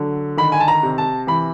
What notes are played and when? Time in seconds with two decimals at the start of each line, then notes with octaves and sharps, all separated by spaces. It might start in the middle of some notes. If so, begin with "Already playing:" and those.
Already playing: D3 F#3
0.37 D#3 B5
0.52 G#5
0.60 A5
0.68 A#5
0.83 C3
0.98 A5
1.27 E3 B5